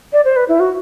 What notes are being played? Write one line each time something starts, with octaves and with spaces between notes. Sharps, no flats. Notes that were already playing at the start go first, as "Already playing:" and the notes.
D5
C5
B4
E4
F#4